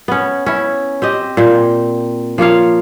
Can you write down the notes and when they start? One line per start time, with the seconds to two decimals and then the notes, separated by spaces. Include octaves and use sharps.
0.08 B3 C#4
0.46 C#4 E4
1.02 C4 G4 D#5
1.37 A#2 C4
2.38 F3 A#3 C#5 F5